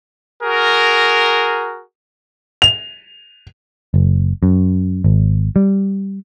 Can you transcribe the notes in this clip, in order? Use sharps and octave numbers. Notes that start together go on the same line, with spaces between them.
F#4 G#4 A#4
F7
F#1
F#2
G#1
G3